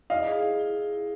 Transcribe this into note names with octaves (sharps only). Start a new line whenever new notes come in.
E4 D#5 F5
G#4
E4
E4
E4
E4